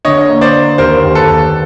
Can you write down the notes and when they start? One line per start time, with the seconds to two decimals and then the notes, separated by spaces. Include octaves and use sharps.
0.05 D3 C#5 D#5
0.29 A#3
0.41 C5 D5
0.53 A#3
0.78 D#2 A#4 C5
1.04 D#2
1.15 A4 B4
1.29 D#2